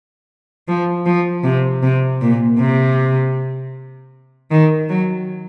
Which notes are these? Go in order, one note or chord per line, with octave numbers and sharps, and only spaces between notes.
F3
F3
C3
C3
A#2
C3
D#3
F#3